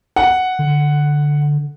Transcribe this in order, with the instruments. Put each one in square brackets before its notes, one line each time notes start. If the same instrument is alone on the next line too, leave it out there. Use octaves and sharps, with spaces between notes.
[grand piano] F#5
[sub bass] D3